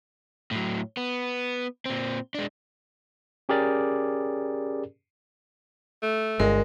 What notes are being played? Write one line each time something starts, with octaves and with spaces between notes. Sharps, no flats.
A2 F#3
B3
A#2 C4
G#3 D4
C#4 G4 G#4 A#4 D5
A3
G1 G#3 A#4